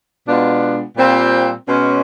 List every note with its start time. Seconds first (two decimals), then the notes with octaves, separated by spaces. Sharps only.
0.26 B2 G#3 B3 D4 F4
0.96 A#2 G3 C4 F4
1.68 B2 G#3 C#4